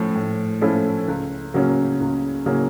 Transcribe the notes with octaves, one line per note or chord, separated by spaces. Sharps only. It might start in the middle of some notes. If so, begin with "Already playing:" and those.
Already playing: A2 F3 A3 C#4
A2
F3 A3 C#4 E4
C#2
C#3 F#3 A#3 C#4
C#2
C#3 F#3 A#3 C#4